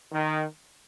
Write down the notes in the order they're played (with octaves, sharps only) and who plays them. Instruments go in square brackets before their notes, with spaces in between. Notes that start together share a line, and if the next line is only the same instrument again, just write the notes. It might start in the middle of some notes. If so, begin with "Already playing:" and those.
[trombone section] D#3